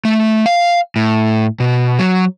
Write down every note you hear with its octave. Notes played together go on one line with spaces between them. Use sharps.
A3
F5
A2
B2
F#3